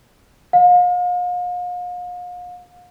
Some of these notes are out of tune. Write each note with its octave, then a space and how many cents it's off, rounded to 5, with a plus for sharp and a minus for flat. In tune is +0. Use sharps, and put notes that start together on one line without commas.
F5 +40